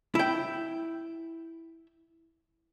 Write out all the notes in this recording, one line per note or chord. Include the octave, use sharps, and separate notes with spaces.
E4 G5